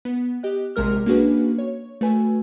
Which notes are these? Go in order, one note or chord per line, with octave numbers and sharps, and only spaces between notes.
B3
G4 D#5 F#6
A#1 C3 G#3 A#4 F6
A#3 C#4 D4 F#4 G#4 B4
C#5
A3 F#4 B4 G#5